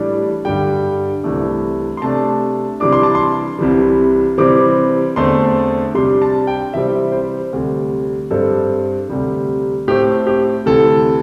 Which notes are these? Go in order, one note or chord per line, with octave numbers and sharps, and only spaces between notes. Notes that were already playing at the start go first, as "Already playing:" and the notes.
Already playing: A2 E3 G3 D4
G2 D3 G3 G5
C2 C3 E3 A3 D4
C6
C3 A3 D4 A5
C3 E3 G3 D4 D6
C6
A5
C6
C2 C3 E3 G3
C3 E3 G3 C4 D6
E2 D3 A3 C4 C6
C3 G3 D4 C6
A5
G5
C3 E3 G3 C4 E5
C5
D2 C3 G3
G2 G3 C4 A4
D2 C3 G3
A2 A3 C4 G4
G4
D2 C3 E3 A4